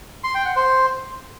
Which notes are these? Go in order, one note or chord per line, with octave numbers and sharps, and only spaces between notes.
C6
G5
F#5
C5